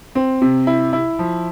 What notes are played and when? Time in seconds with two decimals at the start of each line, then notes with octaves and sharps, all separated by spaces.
0.15 C4
0.42 C3
0.67 E4
0.93 E4
1.19 F3